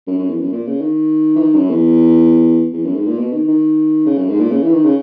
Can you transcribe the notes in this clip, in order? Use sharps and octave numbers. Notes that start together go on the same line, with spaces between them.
F#2
F#2
E2
F#2
A#2
C#3
D#3
E3
D#3
F#2
E2
E2
F#2
G#2
A#2
B2
D#3
D#3
C#3
F#2
G#2
A#2
C#3
E3
D#3
C#3